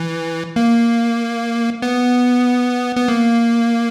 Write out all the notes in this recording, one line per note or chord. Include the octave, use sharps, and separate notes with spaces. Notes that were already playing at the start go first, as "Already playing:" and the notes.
Already playing: E3
A#3
B3
B3
A#3